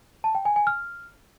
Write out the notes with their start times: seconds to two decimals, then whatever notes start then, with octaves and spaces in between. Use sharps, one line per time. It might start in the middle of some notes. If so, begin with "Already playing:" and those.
0.24 A5
0.35 G5
0.45 G#5
0.56 G#5
0.67 F6